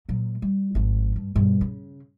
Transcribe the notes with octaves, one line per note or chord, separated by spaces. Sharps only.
A#2 F#3
G3
G#1 F3
G2
G2 B2
C#3